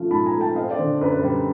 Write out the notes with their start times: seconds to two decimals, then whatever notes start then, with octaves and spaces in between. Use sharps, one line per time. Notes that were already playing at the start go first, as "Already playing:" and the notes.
Already playing: F3 A3 C#4
0.10 G#2 A5 B5
0.26 G#5 A#5
0.33 A3
0.41 G5 A5
0.56 C4 D#5 F5
0.71 C5 D5
0.78 D3
1.01 F#2 B4
1.16 B4
1.23 G3